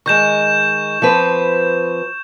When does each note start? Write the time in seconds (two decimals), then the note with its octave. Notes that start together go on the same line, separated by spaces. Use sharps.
0.06 D#3 G#3 C#6 G6 E7
1.02 F3 C4 B4